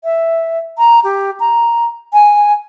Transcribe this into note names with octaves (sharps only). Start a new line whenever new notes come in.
E5
A#5
G4
A#5
G#5